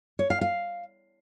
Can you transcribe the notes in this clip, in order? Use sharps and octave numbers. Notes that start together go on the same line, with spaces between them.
C#5
F5
F5